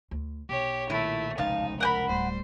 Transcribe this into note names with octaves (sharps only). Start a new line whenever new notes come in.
D2
B1 G4 C#5
A#2 D#3 A3 E4
F1 C#2 D#4 F5 A5
A#4 F#5 G5 B5
D1 G3 C5